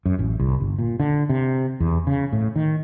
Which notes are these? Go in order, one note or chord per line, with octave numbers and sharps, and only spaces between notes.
F#2
A1
C2
G1
A#2
D3
C3
E2
C#3
A2
D#3